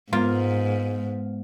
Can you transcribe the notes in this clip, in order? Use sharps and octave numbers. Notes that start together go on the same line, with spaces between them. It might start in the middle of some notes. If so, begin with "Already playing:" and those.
G#2 G#3 A#3 B3 F4 A#4 F5